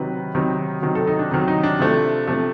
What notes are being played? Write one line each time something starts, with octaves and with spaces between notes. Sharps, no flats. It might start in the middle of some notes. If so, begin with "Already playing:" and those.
Already playing: C3 D#3 F#3 B4
C3 D#3 F#3
C3 D#3 F#3
A4
D#4
D4
C3 D#3 F#3 D#4
D#4
D4
C3 F3 A3
C3 F3 A3